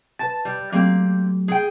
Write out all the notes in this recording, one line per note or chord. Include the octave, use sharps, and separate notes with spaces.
B4 A5 A6
G3
F#3 A3 A#3 C4 G4
G#4 G5